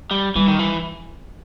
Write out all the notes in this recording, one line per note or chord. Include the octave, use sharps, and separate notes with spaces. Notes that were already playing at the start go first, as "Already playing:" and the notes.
G3
E3 G3
D#3
E3